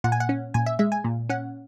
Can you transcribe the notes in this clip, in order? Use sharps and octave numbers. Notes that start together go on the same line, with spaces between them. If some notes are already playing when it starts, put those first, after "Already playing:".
A#2 F#5
G#5
F#5
C#4
A#2 G#5
E5
G#3 E5
G#5
A#2
C#4 F#5